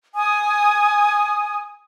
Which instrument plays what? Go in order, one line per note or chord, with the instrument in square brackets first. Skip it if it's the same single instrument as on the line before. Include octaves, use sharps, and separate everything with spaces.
[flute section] G#5 D#6